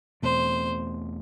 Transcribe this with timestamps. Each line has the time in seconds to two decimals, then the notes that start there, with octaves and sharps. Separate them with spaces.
0.22 E2 B2 A3 C4 C5